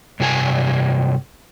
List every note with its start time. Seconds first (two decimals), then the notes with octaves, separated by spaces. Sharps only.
0.20 G2 C3 F4 G4 G#5 A5